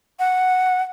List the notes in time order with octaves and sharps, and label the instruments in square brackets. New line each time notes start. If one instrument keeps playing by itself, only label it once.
[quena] F#5